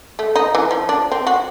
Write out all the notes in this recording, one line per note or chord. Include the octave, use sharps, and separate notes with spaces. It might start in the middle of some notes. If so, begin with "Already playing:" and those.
A3
D#4
E3
F3
D4
C4
F#4